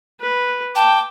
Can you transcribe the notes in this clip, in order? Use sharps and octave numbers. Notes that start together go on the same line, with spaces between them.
B4
G5 A5 D6